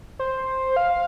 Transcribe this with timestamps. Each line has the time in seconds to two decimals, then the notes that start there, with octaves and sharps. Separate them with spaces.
0.19 C5
0.76 F5